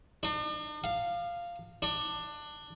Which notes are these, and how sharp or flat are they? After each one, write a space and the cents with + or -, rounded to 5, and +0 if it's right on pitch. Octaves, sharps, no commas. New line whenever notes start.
D4 +45
F5 -5
D4 +20